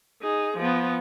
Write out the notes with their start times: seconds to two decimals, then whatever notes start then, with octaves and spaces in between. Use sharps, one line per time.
0.22 D#4 G#4
0.57 F3 B3